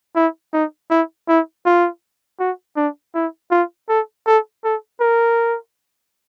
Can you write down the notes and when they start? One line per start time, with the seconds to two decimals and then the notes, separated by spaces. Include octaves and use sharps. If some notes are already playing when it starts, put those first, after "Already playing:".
0.16 E4
0.53 D#4
0.90 E4
1.28 E4
1.66 F4
2.40 F#4
2.77 D4
3.15 E4
3.51 F4
3.89 A4
4.27 A4
4.64 A4
5.00 A#4